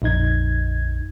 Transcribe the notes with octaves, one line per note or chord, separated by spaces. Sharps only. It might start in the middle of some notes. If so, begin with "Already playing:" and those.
A#1 F2 D#4 G#6